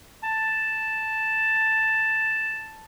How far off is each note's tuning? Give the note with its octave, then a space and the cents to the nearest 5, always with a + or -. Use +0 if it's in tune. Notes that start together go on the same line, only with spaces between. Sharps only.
A5 +0